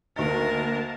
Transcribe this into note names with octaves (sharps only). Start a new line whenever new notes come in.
D2 A#3 D#4 A#4 A5 A6